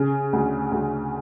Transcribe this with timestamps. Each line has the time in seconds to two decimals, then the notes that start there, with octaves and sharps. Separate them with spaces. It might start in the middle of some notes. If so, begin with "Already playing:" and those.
Already playing: C#3
0.33 D2
0.72 D2